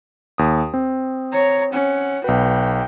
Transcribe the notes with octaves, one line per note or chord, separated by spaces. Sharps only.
D#2 D#6
C4
C#5 A#5
C#4 F#5
B1 F#4 B4 G5